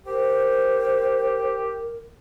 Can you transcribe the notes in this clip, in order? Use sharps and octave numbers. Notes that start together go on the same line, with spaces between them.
G4 A#4 C5